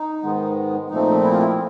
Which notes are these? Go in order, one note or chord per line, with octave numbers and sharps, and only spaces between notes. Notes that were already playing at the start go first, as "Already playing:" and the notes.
Already playing: D#4
G#2 D#3 G#3 B3
A#2 F3 A3 C4 D#4
E4
F4
E4